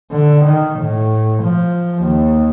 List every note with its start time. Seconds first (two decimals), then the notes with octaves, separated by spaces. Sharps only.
0.11 D3
0.46 D#3
0.79 A2
1.44 F3
2.03 D#2